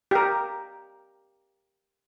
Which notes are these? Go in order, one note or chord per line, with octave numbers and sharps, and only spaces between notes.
G4 A#4